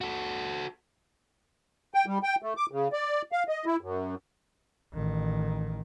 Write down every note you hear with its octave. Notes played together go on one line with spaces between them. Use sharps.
F#4 A4
G5
G3
G5
A3
D6
C#3
D5
F5
D#5
E4
F#2
A1 D#3